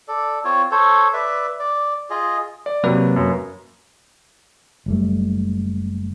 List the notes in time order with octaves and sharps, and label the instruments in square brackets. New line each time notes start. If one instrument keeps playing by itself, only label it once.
[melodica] A4 D5
C4 F4 C#5
A4 C5 C#5
B4 D5 E5
D5
F4 G#4 D#5
[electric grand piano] D5
[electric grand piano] C3 [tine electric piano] F#3 A#3 B4
[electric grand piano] F#2
[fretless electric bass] F#1 G3 A3